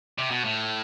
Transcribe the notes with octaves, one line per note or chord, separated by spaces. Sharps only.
C3
B2
A2